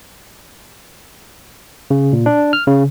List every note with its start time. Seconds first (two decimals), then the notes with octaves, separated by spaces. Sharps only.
1.91 C#3
2.13 A#2
2.26 D4
2.53 F6
2.67 C#3